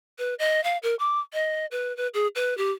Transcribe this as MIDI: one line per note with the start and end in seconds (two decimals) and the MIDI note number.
0.19 0.34 71
0.39 0.63 75
0.64 0.78 77
0.83 0.95 70
0.99 1.20 86
1.33 1.66 75
1.71 1.95 71
1.97 2.08 71
2.14 2.27 68
2.35 2.56 71
2.57 2.71 67